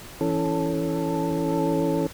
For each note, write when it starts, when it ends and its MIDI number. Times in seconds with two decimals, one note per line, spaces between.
0.21 2.06 52
0.21 2.06 61
0.21 2.06 69